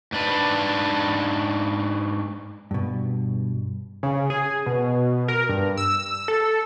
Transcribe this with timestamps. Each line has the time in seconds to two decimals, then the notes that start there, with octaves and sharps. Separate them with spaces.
0.12 G#2 D4 B4
2.71 G2 B2
4.03 C#3
4.30 G#4
4.66 B2
5.28 A#4
5.49 G2
5.77 E6
6.28 A4